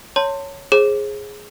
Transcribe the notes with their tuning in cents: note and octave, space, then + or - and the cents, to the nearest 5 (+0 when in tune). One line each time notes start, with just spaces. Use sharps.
C#5 +0 A5 +35 C6 +0
G#4 +0 C5 +40